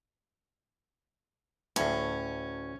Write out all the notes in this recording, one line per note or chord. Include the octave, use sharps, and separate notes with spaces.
D2 A2 C#4